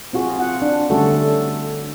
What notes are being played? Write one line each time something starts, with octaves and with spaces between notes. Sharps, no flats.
C4 F4 F#4 G#4
F4 F#5
D4
D3 G3 A3 C#4 F#4 A4